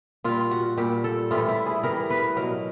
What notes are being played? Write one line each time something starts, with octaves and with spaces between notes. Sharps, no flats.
A#2 G3 F4
F#4
A#2 G3 G4
A4
A2 E3 G3 F4
E4
G#4
A2 E3 G3 A#4
B4
B2 F#3 A#4